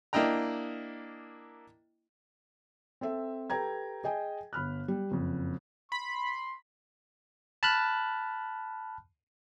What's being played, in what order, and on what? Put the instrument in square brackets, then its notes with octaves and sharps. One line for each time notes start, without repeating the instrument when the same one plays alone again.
[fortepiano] A#3 D4 E4 D#5 G5 A#5
[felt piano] C4 A4 E5
G4 A4 B4 G5 A#5 G#6
G#4 D#5 G5 G#5
G1 B5 F6 F#6
G3
F#1 F2
[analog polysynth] B5 [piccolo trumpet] C6
[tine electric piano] A5 B5 F6 F#6